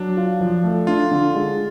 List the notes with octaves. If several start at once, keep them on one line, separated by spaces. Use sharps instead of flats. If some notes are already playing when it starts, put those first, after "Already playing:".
Already playing: F#3 D4
F4
F3
A3
D4 F4
D3
G#3